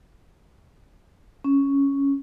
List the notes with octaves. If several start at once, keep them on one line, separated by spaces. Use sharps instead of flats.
C#4